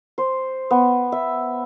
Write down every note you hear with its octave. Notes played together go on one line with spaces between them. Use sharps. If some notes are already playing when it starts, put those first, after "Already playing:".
C5
B3
E5